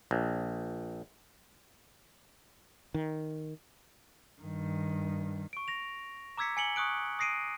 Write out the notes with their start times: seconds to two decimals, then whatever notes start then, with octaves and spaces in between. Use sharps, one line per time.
0.11 A#1
2.94 D#3
4.42 G2 D#3
5.53 C#6 D7
5.68 A#6 F7
6.37 A#5 D6 E6 G#6 B6 C#7
6.57 G#5 C#7 F#7 G7
6.76 C#6 D#6 F#6 D7
7.19 D#6 A#6 C7 D7 D#7